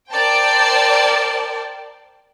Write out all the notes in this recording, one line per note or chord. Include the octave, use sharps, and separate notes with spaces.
A#4 C5 D5 G5 A5